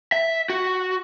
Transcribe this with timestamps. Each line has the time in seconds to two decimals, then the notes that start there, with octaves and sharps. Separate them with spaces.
0.12 E5
0.50 F#4